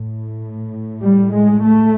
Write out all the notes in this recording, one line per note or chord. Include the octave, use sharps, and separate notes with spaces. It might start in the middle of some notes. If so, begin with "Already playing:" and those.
Already playing: A2
G3
G#3
A3